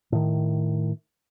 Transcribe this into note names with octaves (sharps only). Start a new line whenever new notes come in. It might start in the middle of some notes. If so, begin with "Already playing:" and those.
A2 D#3